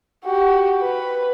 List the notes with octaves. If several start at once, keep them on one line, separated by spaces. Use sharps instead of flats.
F#4 G4
B4